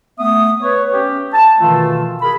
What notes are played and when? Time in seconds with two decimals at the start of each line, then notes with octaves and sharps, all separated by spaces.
0.19 A3 B3 E5 D#6
0.62 B4 C#5
0.93 C#4 G4
1.33 A5
1.60 B2 D#3 E3 A3 F4
2.22 G#4 A#4 B5